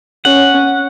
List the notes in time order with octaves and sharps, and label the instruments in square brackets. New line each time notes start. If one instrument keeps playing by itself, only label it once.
[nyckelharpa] C#4 [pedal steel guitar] F#5